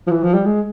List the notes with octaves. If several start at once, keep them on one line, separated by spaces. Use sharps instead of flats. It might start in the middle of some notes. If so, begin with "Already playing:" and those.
F3
E3
F3
G3
G#3